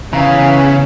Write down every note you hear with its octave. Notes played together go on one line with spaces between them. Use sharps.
C#3 E3 B3 C#4 E5 F5 G#5 A#5